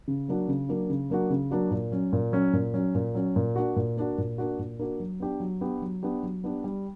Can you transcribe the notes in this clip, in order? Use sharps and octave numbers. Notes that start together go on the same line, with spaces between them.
C#3
F#3 A#3 D4 F#4
C#3
F#3 A#3 D4 F#4
C#3
F#3 A#3 D4 F#4
C#3
F#3 A#3 D4 F#4
A#2
F#3 C#4
A#2
F#3 C#4
A#2
F#3 C#4
A#2
F#3 C#4
A#2
A#3 D4 F#4
A#2
A#3 D4 F#4
A#2
A#3 D4 F#4
A#2
A#3 D4 F#4
F#3
B3 D4 G4
F#3
B3 D4 G4
F#3
B3 D4 G4
F#3
B3 D4 G4
G3